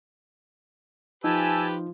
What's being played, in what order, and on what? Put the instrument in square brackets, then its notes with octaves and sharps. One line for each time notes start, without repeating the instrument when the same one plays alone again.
[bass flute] F3 [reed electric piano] D#4 F4 [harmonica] G4 B4 [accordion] G#5 A5 E6